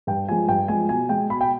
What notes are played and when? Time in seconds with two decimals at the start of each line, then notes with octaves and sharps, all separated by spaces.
0.07 G2 G5
0.28 F3 G#3 G#5
0.49 G2 G5
0.68 F3 G#3 G#5
0.89 B2 G#5
1.09 G#3 G5
1.30 B2 B5
1.41 G5